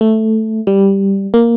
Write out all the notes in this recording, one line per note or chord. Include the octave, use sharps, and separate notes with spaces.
A3
G3
A#3